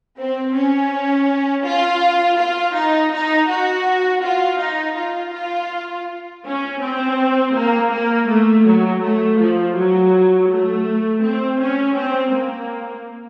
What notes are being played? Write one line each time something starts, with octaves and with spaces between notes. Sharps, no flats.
C4
C#4
F4
F4
D#4
D#4
F#4
F4
D#4
F4
F4
C#4
C4
A#3
A#3
A3
F#3
A3
F3
F#3
A3
C4
C#4
C4
A#3